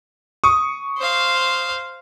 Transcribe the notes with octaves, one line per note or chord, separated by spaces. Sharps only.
C#6 D#6
C5 F5